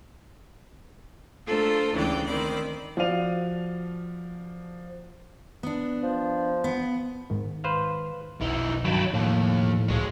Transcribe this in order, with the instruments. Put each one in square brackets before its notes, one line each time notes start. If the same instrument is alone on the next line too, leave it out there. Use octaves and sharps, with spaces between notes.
[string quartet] A3 D4 F4 A4 A#4 C5
D2 C#3 E3 G#3 D5 G5
D#3 C4 D5 B5
[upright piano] F3 F#4 D5 F5 D#7 F7
[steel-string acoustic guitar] B3 D4
[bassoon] F3
[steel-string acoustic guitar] B3
[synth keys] G#2 D#3
[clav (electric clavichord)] B4 C5 F5
[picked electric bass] F1 B1 [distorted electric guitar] E3 D#4
[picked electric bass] G2 D#3 [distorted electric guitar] F#3 [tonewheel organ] G5 A5 B5
[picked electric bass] E1 F3 [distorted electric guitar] D#2 [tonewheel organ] A2
[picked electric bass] E1 C#2 [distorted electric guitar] G#3 F#4